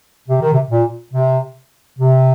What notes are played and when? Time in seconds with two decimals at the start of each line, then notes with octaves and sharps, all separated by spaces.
0.29 C3
0.41 D#3
0.53 C3
0.71 A#2
1.14 C3
1.99 C3